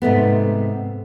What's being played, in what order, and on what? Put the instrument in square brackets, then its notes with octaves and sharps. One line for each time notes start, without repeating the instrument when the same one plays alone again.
[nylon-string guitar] G#2 C3 A3 B3